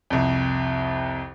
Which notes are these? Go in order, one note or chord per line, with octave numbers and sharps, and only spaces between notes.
C2 F2